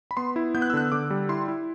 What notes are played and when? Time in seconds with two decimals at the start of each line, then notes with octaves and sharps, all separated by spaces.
0.11 B5
0.17 B3 C6
0.36 E4
0.55 B3 G6
0.62 F#6
0.70 E6
0.73 D3 F#6
0.92 D3 D6
1.10 G3
1.29 E4 C6
1.48 E4